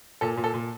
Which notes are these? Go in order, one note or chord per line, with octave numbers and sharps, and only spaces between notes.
A#2 A4
A#2
A4
A#2